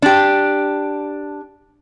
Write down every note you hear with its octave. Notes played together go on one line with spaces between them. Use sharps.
D4 G4